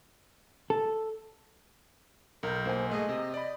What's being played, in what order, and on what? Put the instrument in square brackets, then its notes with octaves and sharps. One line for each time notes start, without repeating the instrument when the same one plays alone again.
[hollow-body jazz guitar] A4
[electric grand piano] B1 G6 [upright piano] A#4
[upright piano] A#3 G#5 [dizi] C5
[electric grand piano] G#2 A3 G#4 [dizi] D#5
[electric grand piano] C3
[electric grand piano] D5 B5 [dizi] D#5